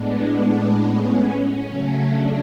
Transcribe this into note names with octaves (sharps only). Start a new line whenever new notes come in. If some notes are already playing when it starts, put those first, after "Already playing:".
Already playing: A2 G#3 B3 D4
C#4
C#3 F#3 A3
D4